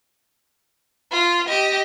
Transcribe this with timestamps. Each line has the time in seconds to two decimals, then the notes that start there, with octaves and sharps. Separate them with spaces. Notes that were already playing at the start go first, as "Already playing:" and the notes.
1.12 F4
1.48 G4 D#5